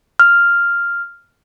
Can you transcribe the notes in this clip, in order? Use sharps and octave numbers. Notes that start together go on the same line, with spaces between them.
F6